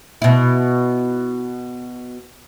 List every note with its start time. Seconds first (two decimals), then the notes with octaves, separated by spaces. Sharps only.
0.22 B2 E4